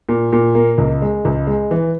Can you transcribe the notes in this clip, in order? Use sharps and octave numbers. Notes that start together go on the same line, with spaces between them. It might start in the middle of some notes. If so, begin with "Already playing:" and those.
A#2
A#2
A#3
C#2
G#3
C#2
G#3
E3